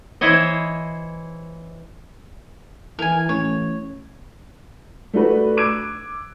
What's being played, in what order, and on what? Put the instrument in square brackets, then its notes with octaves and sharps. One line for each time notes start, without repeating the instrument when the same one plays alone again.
[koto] E3 E4 C5 C#5 D#5
[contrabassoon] E3 [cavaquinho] A#4 G#5
[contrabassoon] A1 [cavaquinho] C#5
[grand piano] A3 D4 F#4 B4
D6 E6 F#6 G#6 D7